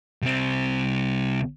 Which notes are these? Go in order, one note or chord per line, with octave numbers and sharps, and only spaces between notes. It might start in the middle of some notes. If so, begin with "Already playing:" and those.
C2 C4